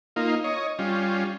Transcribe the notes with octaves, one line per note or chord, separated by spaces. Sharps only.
A#3 D#4 F4
C#5 D#5
G3 C#4 F4